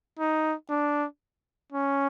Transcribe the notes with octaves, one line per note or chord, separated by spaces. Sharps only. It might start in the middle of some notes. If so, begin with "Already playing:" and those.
D#4
D4
C#4